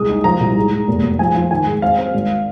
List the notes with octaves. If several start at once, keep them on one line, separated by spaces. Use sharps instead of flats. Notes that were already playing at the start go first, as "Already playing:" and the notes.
Already playing: C2 G#3 D#6
D#4
F3 A#5
C2
G#2
G#2
F1
F1
F3 G#5
F3
D#3 G#5
G#2
C4 F5
C4
G#1